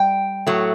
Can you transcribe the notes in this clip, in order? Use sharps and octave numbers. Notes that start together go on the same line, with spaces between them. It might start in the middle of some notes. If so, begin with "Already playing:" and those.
Already playing: G3 G5
A2 F#3 A3